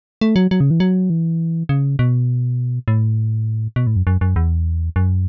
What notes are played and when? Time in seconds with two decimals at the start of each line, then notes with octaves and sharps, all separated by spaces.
0.21 A3
0.36 F#3
0.51 F#3
0.60 C#3
0.71 E3
0.80 F#3
1.10 E3
1.69 C#3
1.99 B2
2.88 A2
3.76 B2
3.87 A2
3.96 F#2
4.07 F#2
4.21 F#2
4.36 E2
4.96 F#2